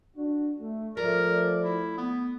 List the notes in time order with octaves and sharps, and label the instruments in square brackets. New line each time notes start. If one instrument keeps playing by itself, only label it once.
[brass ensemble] D4 F#4
A3
[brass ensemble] F3 D5 [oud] A3 [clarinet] A#4
[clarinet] E4
B3